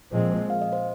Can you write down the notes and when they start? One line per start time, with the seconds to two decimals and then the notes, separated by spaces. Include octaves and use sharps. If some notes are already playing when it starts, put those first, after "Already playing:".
0.13 A#2 F3 G#3 C4
0.50 F5
0.62 D#5
0.73 C5